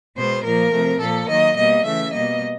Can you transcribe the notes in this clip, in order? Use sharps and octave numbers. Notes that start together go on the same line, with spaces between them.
B2 G#3 B3 C5
A#2 F3 A#3 A#4
C3 F3 A3
A#2 F3 A#3 A4
D#3 F#3 A#3 D#5
B2 G3 A#3 D#5
C#3 E3 A3 E5
B2 G3 A#3 D#5